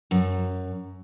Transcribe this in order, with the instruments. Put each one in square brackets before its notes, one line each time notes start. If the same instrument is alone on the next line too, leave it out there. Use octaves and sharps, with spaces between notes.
[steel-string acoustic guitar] F#2